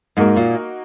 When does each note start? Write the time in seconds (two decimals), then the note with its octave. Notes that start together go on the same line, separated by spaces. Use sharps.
0.17 G#2 A#3 D#4 F#4 A#4
0.36 A#2